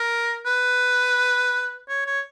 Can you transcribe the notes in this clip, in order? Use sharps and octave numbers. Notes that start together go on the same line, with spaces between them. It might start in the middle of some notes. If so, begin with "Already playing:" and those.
Already playing: A#4
B4
C#5
C#5